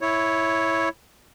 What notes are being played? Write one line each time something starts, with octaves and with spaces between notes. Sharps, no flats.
E4 C#5